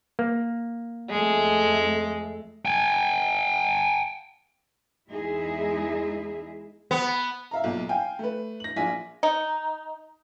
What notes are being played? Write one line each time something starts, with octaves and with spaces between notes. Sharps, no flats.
A#3
F2 G#3 A3
G5 G#5
E2 G#3 D#4 E4 G#4 E5
B3
E5 F5 A#5
B1 A#2
F5 G5 G#5
A3 B4
A#6 F#7
A#1 F4 G#5 B6
D#4